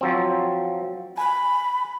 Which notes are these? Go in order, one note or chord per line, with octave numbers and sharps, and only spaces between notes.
F3 F#3 C4
G#5 B5